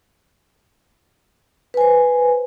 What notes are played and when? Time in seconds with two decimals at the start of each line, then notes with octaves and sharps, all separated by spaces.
1.74 B4
1.77 G#5
1.81 C5